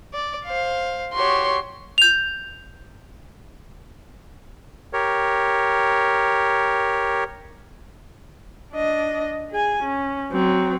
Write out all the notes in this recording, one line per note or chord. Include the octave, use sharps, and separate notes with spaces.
D5
C5 F5
F#4 G4 C#5 C6
G6 F7
G4 A#4 C#5
D4 D#5
G#4 G#5
C#4
F#3 C4